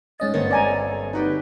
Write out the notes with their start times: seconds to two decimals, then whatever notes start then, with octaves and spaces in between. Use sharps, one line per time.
0.20 G#2 C#4 D#5 A6
0.34 G1 A#3 C4 C#5 D#5
0.51 D5 G#5 A#5
0.63 A4
1.13 D#4 F#4 G4 B4